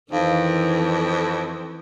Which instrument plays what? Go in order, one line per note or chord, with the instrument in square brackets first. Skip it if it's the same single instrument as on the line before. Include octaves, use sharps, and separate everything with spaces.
[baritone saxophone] F2 [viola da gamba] D#3 E3 [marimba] D#4 F5